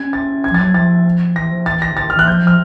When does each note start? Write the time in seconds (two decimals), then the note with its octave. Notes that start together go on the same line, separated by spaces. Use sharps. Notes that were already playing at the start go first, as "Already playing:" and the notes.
Already playing: C#4 G#6
0.13 A6
0.44 G#6
0.51 F3
0.54 A6
0.59 F#3 G#6
0.74 F3 A6
1.35 E3 A#6
1.51 F3
1.66 E3 A6
1.82 A#6
1.91 D3
1.97 A6
2.03 D#3
2.10 F6
2.15 E3 F#6
2.28 F3 G6
2.43 F3 F6